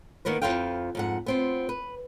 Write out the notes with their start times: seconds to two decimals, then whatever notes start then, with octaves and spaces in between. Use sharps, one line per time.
0.25 D#3 A#3 B3 A#4 B4
0.42 F2 G#2 E4 F4 F5 G5
0.95 F2 G#2 F#5
1.26 B3 C4 F4
1.69 B4